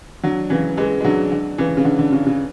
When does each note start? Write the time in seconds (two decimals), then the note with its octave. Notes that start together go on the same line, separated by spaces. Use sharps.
0.23 D3 F#3
0.50 C#3 E3
0.77 E3 G#3
1.01 G#3
1.04 D3 F#3
1.32 D3
1.58 C#3 E3
1.77 C#3
1.85 D3
1.99 D3
2.12 C#3
2.27 C#3